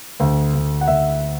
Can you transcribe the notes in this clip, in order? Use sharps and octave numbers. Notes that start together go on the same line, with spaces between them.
D2
D2
F#5
D2 E5